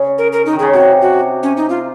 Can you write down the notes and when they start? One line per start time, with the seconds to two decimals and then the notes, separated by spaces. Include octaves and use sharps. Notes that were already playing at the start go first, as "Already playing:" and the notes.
Already playing: C#3
0.18 A#4
0.33 A#4
0.46 D#4
0.53 D#3
0.59 C#3 G#4
0.73 C3 F#4
1.02 F#4
1.43 C#4
1.57 D#4
1.70 F4